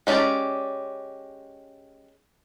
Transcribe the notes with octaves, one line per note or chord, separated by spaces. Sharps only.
G#3 C#4 G4 D5